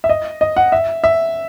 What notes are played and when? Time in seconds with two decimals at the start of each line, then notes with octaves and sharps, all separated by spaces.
0.04 E5
0.09 D#5
0.41 D#5
0.57 F#5
0.72 E5
1.04 E5